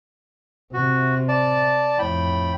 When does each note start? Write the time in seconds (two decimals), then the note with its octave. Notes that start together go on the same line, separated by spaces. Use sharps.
0.74 C3 F#4
1.28 D5 A5
1.99 F2 A2 G5 B5